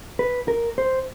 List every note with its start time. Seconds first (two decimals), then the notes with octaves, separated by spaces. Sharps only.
0.19 B4
0.48 A#4
0.78 C5